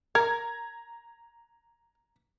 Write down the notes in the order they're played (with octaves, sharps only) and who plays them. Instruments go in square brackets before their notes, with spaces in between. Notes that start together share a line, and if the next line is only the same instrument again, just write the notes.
[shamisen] A#4 [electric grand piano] A#5 G#6